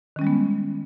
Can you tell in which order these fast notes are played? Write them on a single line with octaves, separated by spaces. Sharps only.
D#3 C#4 G3 G#3 B3